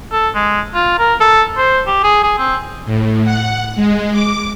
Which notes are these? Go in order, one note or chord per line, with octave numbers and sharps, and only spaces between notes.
A4
G#3
F4
A#4
A4
C5
G4
G#4
G#4
C4
A2
F#5
G#3
D6